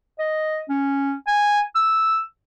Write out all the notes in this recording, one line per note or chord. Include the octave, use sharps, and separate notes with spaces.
D#5
C#4
G#5
E6